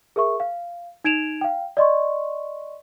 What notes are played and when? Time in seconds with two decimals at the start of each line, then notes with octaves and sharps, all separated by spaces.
0.16 G#4 A#4 E5 C#6
0.40 F5
1.04 D#4 G#6 D7 E7 F7
1.41 F5 G5
1.77 D5 D#5 C6 C#6